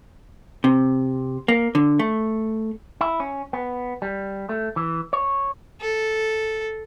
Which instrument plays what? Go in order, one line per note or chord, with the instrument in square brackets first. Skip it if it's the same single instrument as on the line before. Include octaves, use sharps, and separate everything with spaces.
[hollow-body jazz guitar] C3
A#3
D3
A3
[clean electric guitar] E4
C#4
B3
G3
A3
E3
C#5
[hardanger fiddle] A4